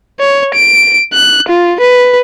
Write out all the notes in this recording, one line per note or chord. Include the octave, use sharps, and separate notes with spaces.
C#5
D7
F#6
F4
B4